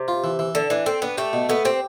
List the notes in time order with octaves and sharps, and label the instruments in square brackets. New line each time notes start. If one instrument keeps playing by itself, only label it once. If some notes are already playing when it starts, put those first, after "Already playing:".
Already playing: [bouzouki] C3
[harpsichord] F4
E3
E3
[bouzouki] D3 [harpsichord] A4
[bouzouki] E3 [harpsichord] D4
[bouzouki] C4 [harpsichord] A4
[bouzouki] B3 [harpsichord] D4
[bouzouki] A3 [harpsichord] G4
[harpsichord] B2
[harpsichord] A3 [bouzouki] B3
[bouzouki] C4 [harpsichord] G4